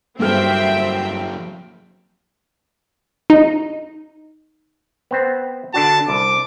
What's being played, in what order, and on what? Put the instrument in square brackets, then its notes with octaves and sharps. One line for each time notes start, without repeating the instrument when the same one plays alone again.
[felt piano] G2 A4 F6 [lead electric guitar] F#3 A#3 [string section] C4 E5 G5
[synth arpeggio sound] D#4
[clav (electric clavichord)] B3 C4 C5
[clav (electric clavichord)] D3 D4 F#4 [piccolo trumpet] A5
[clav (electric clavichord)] C2 [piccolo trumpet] D6